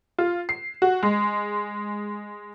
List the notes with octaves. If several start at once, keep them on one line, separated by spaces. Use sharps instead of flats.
F4
C7
F#4
G#3